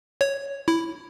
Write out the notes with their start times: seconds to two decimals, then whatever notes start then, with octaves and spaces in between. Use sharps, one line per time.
0.21 C#5
0.68 E4